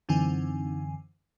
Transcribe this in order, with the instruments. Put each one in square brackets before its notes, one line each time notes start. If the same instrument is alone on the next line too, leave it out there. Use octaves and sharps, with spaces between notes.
[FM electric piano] F#2 D3 E3 C4 D#4 G#5